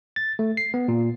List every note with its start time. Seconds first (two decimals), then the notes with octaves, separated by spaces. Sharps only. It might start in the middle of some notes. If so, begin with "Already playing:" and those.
0.16 A6
0.39 A3
0.57 C7
0.74 B3
0.88 A#2